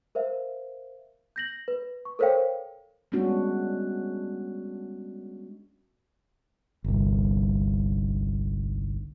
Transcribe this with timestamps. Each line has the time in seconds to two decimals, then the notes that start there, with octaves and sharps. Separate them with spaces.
0.15 A#4 C5 E5 F5
1.36 G6 A#6 F#7
1.68 B4
2.05 C#6
2.19 A4 A#4 C5 C#5 F5 G5
3.12 G3 G#3 B3 C#4 D4 F#4
6.84 G1 C2